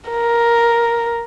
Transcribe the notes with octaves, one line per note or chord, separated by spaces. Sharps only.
A#4